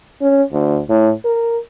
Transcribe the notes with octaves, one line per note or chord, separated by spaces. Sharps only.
C#4
D2
A2
A#4